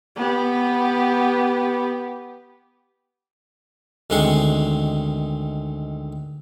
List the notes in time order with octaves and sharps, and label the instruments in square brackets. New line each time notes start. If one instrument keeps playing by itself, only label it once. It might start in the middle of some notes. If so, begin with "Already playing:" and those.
[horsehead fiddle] B3 G4
[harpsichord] D2 D#3 G#3 C4 C6 C#6